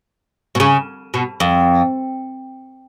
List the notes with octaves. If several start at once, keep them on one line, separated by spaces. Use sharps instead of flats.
B2
C#3
B2
F2